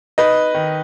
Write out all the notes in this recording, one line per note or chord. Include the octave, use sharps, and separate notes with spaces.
D#4 B4 D#5
D#3